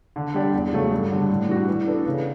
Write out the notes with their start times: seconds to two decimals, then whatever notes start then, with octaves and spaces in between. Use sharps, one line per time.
0.16 D3
0.34 G3 D4 G4 D5
0.53 E2
0.73 C#3 F#3 A3
0.91 G2
1.11 D3 G3
1.30 A2
1.49 E3 G3 D4 F#4
1.67 E3
1.87 B3 D4 A4
2.06 C#3